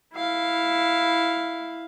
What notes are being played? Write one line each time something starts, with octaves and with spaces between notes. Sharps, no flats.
E4 F5